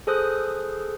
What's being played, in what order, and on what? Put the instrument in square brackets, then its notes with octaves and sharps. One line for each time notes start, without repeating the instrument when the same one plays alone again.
[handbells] G#4 A4 C5 D#6 F#6